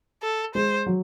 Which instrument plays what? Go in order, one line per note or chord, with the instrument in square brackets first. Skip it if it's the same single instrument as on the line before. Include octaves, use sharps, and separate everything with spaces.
[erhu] A4
[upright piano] G#3 [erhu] C5
[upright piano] F#3